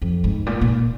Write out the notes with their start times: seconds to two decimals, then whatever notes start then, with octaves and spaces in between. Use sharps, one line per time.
0.02 F2
0.24 G#2
0.46 A#2
0.61 A#2